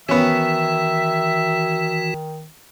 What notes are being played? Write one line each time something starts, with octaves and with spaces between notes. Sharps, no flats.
D#3 E3 B3 C#4 F#4 E5